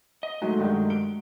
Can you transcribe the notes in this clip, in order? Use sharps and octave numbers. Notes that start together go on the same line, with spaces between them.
D#5
F#3 G#3 A3 D#4
G2 D#3 F#4
D7 G7